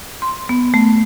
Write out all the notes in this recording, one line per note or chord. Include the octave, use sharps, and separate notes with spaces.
C6
B3
A3